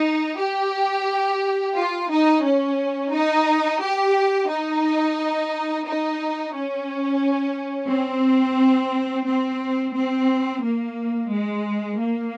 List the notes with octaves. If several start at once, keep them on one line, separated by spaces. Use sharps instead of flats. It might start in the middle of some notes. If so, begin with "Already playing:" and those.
Already playing: D#4
G4
F4
D#4
C#4
D#4
G4
D#4
D#4
C#4
C4
C4
C4
A#3
G#3
A#3